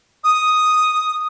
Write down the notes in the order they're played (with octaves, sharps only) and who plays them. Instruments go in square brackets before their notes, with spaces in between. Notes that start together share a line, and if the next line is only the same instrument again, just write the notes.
[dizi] D#6